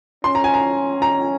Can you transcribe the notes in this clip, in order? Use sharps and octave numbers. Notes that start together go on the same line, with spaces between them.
C#4 C6
A#5
G#5
A#5
A#5